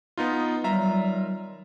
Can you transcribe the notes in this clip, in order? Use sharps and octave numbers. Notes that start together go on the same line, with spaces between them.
B3 D#4 F4
D#3 F#3 G3 F4 E5 A#5